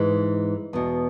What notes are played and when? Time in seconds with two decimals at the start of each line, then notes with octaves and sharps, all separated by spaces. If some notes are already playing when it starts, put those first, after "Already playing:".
Already playing: G#2 E3 G#3
0.73 E2 B2